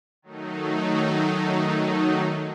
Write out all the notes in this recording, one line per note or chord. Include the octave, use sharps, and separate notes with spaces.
D#3 F#3 A3 D#4